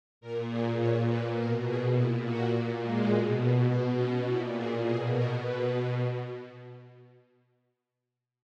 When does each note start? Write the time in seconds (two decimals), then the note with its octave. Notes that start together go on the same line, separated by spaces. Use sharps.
0.21 A#2 A#4
0.49 G#4
0.79 A#2 C#5
1.08 B4
1.36 B2 A#4
1.66 G#4
1.94 A#2 E4
2.24 F#4
2.53 A#2
2.82 G#3
3.10 B2
3.68 B2 B3
3.97 C#4
4.27 A#2 E4
4.55 G#4
4.84 B2 G#4
5.13 A#4
5.42 B2 B4